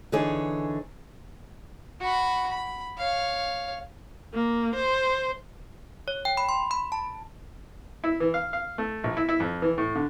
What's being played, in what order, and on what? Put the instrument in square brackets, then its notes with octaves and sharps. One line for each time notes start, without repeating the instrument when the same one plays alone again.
[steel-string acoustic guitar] D3 E3 D#4 G#4 A4 C#5
[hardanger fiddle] F#4 B5
B5
C#5 F5
[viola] A#3
C5
[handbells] C#5
G5
B5
C6
B5
A5
[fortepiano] E4
E3
F5
F5
A3
A#1
E4
E4
F2
E3
A2
D3